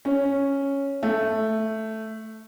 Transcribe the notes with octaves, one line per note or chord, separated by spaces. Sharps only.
C#4
A3